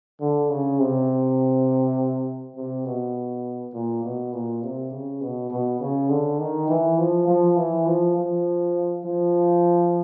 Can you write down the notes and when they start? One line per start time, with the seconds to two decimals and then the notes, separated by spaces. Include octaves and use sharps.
0.20 D3
0.50 C#3
0.79 C3
2.56 C3
2.85 B2
3.73 A#2
4.03 B2
4.33 A#2
4.62 C3
4.92 C#3
5.21 B2
5.50 B2
5.80 C#3
6.09 D3
6.39 D#3
6.68 E3
6.98 F3
7.27 F3
7.56 E3
7.86 F3
8.16 F3
9.04 F3